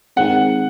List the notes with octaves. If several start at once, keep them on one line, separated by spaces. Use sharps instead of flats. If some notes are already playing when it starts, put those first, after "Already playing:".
D#3 G#3 C4 F#5